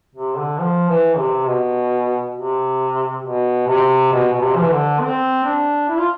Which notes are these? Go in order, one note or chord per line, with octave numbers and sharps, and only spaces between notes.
C3
D3
F3
E3
C3
B2
C3
B2
C3
B2
B2
C3
F3
E3
D3
C4
D4
E4
F4